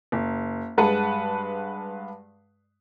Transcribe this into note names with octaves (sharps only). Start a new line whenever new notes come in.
F#1
G2 G#3 B4 F#5 A5